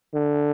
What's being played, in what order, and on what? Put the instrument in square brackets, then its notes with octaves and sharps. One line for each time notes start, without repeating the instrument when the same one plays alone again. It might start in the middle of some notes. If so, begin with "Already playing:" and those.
[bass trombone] D3